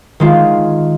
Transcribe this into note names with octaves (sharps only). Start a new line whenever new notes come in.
D#3 G#3 F4